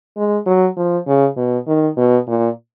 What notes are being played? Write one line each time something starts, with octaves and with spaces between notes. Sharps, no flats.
G#3
F#3
F3
C#3
B2
D#3
B2
A#2